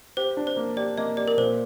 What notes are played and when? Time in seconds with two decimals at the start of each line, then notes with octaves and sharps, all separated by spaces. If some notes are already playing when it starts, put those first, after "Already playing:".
0.17 G4 C5
0.37 D4
0.47 C5
0.56 A#3
0.77 G4 D5
0.98 A#3 D#5
1.17 G4 D5
1.28 A#4
1.37 A#2 C5